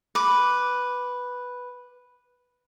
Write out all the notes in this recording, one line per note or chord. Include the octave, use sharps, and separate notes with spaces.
B4 D6